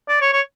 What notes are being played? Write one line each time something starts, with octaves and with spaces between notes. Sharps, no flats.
D5
C#5
C#5